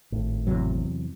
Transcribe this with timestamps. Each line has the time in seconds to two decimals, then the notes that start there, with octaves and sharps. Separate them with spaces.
0.12 G#1 A2
0.47 E2 C3 F#3